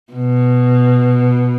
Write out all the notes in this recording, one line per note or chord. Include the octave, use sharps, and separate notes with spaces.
B2